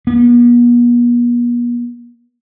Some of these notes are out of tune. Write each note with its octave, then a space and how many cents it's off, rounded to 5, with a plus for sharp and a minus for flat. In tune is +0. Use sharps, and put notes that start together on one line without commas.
B3 -45